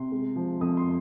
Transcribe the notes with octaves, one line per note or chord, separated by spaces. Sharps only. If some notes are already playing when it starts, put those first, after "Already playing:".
Already playing: C3 C6
G#3
F3
F2 D#6
C6